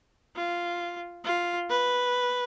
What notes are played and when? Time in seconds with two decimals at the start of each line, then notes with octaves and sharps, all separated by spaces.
0.36 F4
1.24 F4
1.69 B4